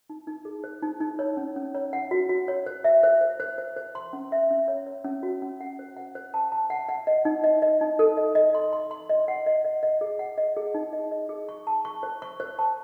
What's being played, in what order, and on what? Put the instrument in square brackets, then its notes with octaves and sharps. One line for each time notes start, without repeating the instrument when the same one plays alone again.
[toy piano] D#4
D#4
G#4
C5
D#4
D#4
C#5
C#4
C#4
C#5
F#5
F#4
F#4
C#5
C5
E5
C5
C5
C5
C5
C5
C6
C#4
E5
C#4
C#5
C#5
C#4
F#4
C#4
F#5
C5
F#5
C5
A5
A5
F#5
F#5
D#5
D#4
D#5
D#5
D#4
A4
D#5
D#5
C6
C6
C6
D#5
F#5
D#5
D#5
D#5
G#4
F#5
D#5
G#4
D#4
D#5
D#5
G#4
C#6
A5
C#6
C5
C#6
C5
A5